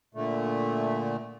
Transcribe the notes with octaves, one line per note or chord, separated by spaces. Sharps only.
A#2 D3 A3